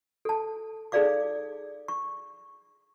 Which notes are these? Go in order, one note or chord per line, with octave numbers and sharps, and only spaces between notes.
A4 A5
D#4 G#4 A4 D5 F5 D6
C#6